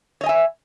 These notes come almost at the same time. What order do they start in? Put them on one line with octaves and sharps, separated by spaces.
C#5 D#5 G#5 E5